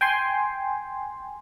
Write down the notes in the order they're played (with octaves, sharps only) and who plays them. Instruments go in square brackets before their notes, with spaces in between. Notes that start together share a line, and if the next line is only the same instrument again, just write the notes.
[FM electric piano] G5 G#5 C6